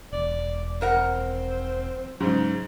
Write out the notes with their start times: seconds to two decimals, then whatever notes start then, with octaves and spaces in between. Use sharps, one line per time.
0.12 E1 D5
0.81 F2 C4 A#4 F#5
2.20 G#2 C#3 F#3 G#3 D#4